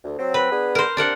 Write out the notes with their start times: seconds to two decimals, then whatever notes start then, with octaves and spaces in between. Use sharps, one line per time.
0.04 D2
0.19 F#3 C4
0.34 B4
0.51 B3 D4 G#4
0.75 A#4 C5
0.97 C3 D4 A#4 F#5